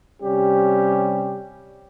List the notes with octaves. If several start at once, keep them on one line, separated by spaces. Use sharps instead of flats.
C3 G3 C#4 G4